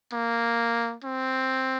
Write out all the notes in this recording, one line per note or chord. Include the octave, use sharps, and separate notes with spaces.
A#3
C4